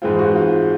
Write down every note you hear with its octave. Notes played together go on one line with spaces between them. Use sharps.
G#2 E3 G#3 C4 F4
F#4
F4